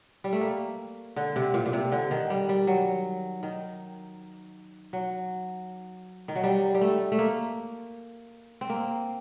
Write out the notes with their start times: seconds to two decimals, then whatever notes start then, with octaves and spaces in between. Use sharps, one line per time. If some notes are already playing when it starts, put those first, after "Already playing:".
0.24 G3
0.33 A3
0.41 A#3
1.16 D3
1.36 C3
1.54 A#2
1.66 A#2
1.73 C3
1.92 D3
2.11 D#3
2.30 G3
2.49 G3
2.67 F#3
3.43 D#3
4.93 F#3
6.28 D#3
6.35 F#3
6.44 G3
6.75 G3
6.81 A3
7.12 A3
7.19 A#3
8.61 C4
8.70 A#3